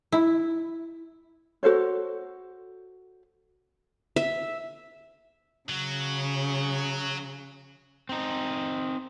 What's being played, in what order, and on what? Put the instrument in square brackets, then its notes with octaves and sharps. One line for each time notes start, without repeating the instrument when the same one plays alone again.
[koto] E4
[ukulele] F#4 A4 C5 C#5
[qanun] E5
[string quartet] C#3 [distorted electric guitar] F#3
[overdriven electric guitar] C4 D#4